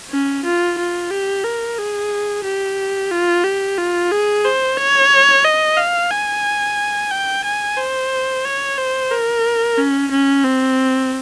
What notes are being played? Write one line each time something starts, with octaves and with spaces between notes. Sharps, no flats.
C#4
F4
F4
G4
A#4
G#4
G4
F4
G4
F4
G#4
C5
C#5
D#5
F5
G#5
G5
G#5
C5
C#5
C5
A#4
C#4
C#4
C4